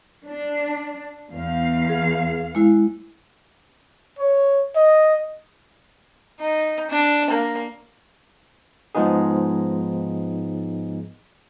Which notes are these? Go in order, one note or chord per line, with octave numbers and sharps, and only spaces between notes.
D4
E2 F5
G#4
G#3 E4
C#5
D#5
D#4
D4
A#3
G#2 F3 G#3 B3 D#4 G#4